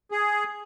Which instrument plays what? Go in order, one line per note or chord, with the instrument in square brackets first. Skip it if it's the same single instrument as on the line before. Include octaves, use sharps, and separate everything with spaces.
[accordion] G#4